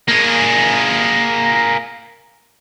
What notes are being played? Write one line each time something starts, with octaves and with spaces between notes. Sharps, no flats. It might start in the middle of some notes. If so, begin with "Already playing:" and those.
A#3 G#4